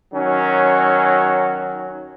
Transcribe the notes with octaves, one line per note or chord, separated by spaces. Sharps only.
D#3 F#3 C#4